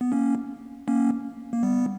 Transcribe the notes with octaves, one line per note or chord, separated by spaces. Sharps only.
B3
A#3 C#4
A#3 C#4
A#3
G3 B3